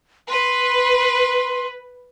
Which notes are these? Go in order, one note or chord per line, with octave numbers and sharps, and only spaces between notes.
B4 C6